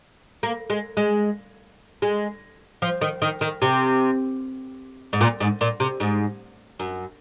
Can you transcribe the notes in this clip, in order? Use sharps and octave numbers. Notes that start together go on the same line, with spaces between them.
A#3
G#3
G#3
G#3
F3
D#3
D#3
D#3
C3
G#2
A#2
G#2
A#2
C3
G#2
F#2